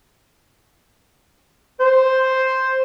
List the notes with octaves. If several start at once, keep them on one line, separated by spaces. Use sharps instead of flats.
C5